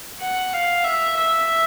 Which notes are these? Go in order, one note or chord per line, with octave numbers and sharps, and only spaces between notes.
F#5
F5
E5
E5